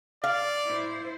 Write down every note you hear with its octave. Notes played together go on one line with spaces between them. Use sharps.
D5 F5
E4 C5